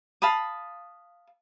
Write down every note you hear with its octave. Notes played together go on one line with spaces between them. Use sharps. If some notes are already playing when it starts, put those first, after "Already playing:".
F5 A5 B5 D#6